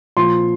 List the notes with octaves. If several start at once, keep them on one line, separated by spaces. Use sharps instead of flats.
A#2 F3 C6